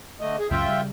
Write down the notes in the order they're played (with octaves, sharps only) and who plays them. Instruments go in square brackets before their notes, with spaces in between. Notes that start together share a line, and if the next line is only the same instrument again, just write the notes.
[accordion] D3 A3 D#5
G#4
[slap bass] C#2 F#2 A2 [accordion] F4 E5 G5
[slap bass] C#3 G3